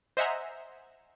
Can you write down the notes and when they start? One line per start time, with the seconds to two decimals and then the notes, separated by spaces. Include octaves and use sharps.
0.17 C5 D#5 E5 F#5 G#5 A#5